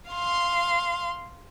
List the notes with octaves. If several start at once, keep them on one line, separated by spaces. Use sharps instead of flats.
F5 C6